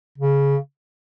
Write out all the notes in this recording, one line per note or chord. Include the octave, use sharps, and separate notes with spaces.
C#3